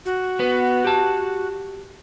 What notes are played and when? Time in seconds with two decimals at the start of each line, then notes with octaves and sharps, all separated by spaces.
0.05 F#4
0.39 B3 B4
0.85 G4 A5